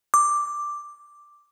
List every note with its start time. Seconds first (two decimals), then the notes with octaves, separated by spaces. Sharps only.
0.14 D6